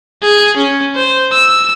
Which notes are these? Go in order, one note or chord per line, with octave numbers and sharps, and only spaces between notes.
G#4
C#4
C5
E6